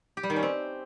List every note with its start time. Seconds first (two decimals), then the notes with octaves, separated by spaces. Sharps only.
0.17 G4
0.23 G3
0.30 D#3
0.36 C#4
0.43 C4